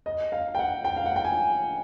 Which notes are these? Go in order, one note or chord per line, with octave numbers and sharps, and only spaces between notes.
D#5
F5
G5
F#5
G5
F5
F#5
G5
G#5